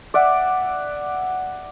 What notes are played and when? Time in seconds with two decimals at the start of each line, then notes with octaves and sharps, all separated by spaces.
0.14 D5 E5 F#5